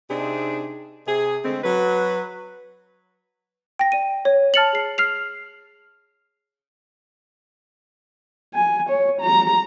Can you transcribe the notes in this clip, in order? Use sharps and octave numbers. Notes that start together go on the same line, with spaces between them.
C3 C4 D4 D#4 G#4
C3 G#4
D3 G#3 A3 C4
F#3 B4
G5 A#6
D5 D#7
C#5
A5 F6 A6 C#7 F7 F#7
G#4 C7
F6 C7 F7
G#5
C#5
A#5